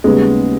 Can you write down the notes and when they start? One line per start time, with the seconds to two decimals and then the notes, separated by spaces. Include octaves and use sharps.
0.04 D#2 C#3 G3 G#3 B3